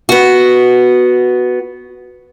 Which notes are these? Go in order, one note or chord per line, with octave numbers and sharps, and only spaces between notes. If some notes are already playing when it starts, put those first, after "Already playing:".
B3 F#4